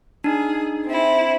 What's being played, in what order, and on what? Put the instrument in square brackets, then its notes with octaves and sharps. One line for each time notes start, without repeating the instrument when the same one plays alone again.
[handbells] D4 D#4 [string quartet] G#4
[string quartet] C4 E4